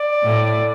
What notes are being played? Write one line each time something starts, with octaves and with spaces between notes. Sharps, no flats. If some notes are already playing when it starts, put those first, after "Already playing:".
Already playing: D5
A2